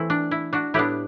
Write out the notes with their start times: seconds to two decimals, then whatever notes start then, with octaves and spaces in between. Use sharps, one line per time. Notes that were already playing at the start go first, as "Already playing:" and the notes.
Already playing: E3 A3 C4 E4
0.10 D4
0.31 E4
0.53 D4 F#4
0.74 A2 G3 B3 D4 E4 G4